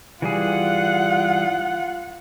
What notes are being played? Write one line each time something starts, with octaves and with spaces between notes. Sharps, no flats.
E3 G3 F4 G#4 F#5